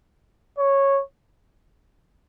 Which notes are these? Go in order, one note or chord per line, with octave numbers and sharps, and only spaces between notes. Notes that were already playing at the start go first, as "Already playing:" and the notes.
C#5